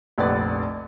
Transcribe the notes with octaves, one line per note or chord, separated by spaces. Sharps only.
F1 A#1 B4 D5 F#5 A6